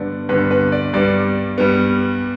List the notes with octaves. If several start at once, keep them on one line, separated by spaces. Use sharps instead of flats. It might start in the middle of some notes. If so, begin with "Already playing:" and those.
Already playing: G2 D3 B3 D5
G2 D3 B3 B4
B4
D5
G2 G3 B3 D5
G2 G3 B3